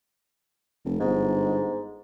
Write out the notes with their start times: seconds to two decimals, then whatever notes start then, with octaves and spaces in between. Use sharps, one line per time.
0.85 F1
1.00 G1 G#2